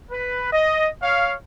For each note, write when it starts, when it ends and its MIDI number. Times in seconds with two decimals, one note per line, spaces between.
0.11 0.51 71
0.52 0.88 75
1.02 1.34 73
1.02 1.34 77